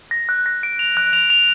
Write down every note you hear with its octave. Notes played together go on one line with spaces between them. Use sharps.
A#6
F#6
A#6
D7
F7
F#6
F7
F7